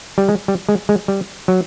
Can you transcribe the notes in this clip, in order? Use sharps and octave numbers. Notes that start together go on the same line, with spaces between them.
G3
G#3
G3
G#3
G#3
G3
F#3